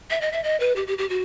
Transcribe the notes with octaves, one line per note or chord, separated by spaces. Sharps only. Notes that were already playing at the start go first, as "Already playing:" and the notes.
E5
D#5
E5
D#5
B4
G4
G4
G4
F#4